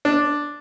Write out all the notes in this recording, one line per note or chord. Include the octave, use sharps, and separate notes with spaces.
D4